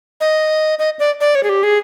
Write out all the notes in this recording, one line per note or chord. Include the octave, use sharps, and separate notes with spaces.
D#5
D#5
D5
D5
C#5
G#4
G4
G#4